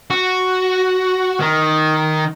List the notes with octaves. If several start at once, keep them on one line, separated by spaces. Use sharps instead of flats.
F#4
D#3